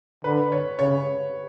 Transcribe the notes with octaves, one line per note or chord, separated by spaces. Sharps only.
D3 B4
C#5
C#3 C#5